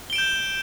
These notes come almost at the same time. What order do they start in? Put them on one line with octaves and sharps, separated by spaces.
G7 D7 E7 G6